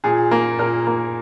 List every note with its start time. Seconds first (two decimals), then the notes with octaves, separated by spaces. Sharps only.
0.04 A#2 G#4
0.31 A#3
0.58 A#2 A#4
0.87 A#3